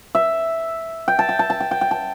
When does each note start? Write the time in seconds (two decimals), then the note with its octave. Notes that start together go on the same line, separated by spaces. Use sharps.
0.15 E5
1.08 G5
1.19 A5
1.29 G5
1.39 A5
1.50 A5
1.60 G5
1.71 G5
1.81 G5
1.91 A5